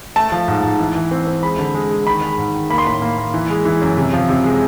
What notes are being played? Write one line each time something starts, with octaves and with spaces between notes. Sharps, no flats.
A3 A5
F3
G#2
G#2
E3
E3
C4
C4
G#3 B5
D3
G#3
G#3
D#3 B5
G#3
G#2
D#3
A#3 B5
C6
A2 B5
A#3
A#3
E3
G#3
E3
F#2
C3
F3
C3
G#3